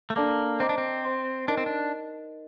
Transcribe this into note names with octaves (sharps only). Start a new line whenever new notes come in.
A3
A#3 D4 A4 D5 A5 D6
C4 C5 D#5 A#5 D6
D4
C4
C5 G5 C6
D4 D#4 A#4 D#5
C4
D4